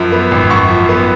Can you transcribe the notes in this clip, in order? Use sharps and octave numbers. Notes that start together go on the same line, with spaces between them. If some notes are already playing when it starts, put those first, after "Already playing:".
Already playing: F#2 F3
B3
G#1
F#2 C#6
F3
B3